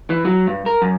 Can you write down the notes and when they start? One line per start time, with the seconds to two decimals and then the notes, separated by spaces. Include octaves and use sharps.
0.10 E3
0.25 F#3
0.47 G2
0.66 A#4
0.82 F#2